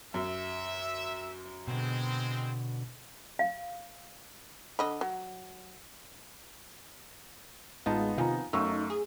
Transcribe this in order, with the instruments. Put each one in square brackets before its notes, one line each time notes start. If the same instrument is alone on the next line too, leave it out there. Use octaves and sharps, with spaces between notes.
[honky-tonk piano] F#2 [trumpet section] E5
[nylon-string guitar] B2 D3 [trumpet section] G#3 C4
[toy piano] F5
[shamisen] D3 D#5 B5
F#3
[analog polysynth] A1 G#3 F4 [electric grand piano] B3 D#4 A5
[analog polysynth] C3 D#3 F3 [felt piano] F5 G#5 A#5
[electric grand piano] F#2 A3 [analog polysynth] D#4 [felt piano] F5 C#6 E6
[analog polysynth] G#4